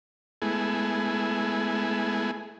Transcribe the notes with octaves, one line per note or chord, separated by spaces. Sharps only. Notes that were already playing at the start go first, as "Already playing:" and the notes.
G#3 A3 B3 E4 G#4